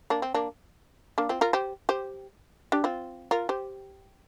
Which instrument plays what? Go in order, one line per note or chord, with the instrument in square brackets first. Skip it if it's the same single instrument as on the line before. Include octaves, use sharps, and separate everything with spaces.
[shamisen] A#3 D4
C4
A#3 D4
A#3 D4
C4 F4
F4 A#4
G4 C5
G4 C5
D4 G4
C4 F4
F4 A#4
G4 C5